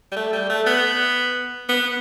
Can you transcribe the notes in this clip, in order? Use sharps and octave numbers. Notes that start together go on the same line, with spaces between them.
G3
A3
G3
A3
B3
B3